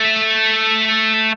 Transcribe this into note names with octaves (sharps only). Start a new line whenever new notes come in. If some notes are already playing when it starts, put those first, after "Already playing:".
Already playing: A3